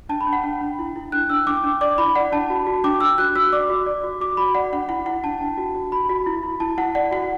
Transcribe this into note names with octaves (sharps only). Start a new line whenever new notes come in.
D4 A5
B5
D4
F#5
D4
D4
E4
E4
D4 F#6
D4 E6
D4 D6
D4
D5 D6
E4 B5
D5 F#5
D4 A5
F#4
F#4
D4 D6
D4 E6
F#4 F#6
F#4 E6
D5 D6
F#4
D5
F#4
F#4 D6
F#4 B5
D5 F#5
D4 F#5
E4 F#5
E4 F#5
D4 A5
D4
F#4
F#4
F#4 B5
F#4
E4
E4
E4 A5
E4 F#5
D5 F#5
F#4 F#5